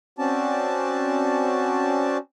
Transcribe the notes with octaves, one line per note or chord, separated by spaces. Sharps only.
C4 C#4 F#4 D5 A5